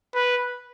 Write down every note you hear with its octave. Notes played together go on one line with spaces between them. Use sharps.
B4